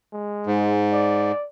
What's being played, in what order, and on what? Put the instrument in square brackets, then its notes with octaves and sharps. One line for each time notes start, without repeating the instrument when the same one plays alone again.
[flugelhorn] G#3
[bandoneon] G#2
[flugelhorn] D5